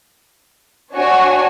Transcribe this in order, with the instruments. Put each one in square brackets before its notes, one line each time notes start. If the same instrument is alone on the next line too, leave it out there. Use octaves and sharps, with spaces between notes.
[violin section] D4 F#4 C#5 G#5